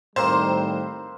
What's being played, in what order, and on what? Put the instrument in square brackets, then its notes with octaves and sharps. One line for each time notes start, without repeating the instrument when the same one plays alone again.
[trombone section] A2 D#3 G3 [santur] A#3 C4 B4 [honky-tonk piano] C5